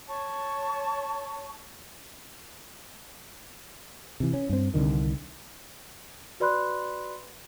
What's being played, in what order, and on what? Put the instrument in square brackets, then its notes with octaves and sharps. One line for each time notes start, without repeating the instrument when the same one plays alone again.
[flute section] C#5 A5 C#6
[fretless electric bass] C3 E3
C#4
G2 C4
C2 B2 D3 D#3
[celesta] F#4 B4 D5 B5 C6 F#6